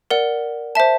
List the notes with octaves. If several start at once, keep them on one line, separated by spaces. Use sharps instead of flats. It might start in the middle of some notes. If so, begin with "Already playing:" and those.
A#4 D5 F#5
C5 E5 A5